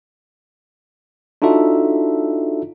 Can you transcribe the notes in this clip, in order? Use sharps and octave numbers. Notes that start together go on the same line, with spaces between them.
D4 D#4 F4 F#4 A4 E5